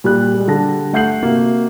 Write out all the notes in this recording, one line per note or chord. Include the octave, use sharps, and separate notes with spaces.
A#2 G3 G4 F#6
G3 G#3
D3 G3 A5 A#6
A3 F#5 G6 C7 F#7
C3 A#3 F#4